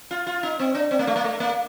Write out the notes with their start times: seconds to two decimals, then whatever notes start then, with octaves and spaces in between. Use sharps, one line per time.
0.11 F4
0.27 F4
0.43 D#4
0.60 C4
0.75 D4
0.91 C4
0.99 A#3
1.07 A3
1.16 A#3
1.24 A3
1.40 A#3